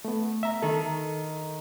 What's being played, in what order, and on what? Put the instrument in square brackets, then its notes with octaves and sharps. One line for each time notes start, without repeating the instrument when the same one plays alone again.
[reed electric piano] A3 B3
E5 A#5
[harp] D#3 [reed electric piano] A4